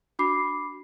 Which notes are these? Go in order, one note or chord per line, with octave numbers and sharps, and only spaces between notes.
D4 F#4 B5 D6 C7